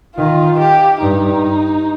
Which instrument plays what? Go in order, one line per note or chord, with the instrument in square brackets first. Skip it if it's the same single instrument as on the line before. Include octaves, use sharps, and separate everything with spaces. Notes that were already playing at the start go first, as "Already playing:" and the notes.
[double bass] D#3 [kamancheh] F4
[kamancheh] G4
[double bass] G2 [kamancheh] D#4